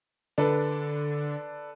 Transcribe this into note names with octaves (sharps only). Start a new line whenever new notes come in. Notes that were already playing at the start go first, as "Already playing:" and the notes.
D3 D4 A4 B4